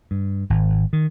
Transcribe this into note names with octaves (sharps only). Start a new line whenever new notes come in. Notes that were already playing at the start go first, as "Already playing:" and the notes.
G2
G#1
D#3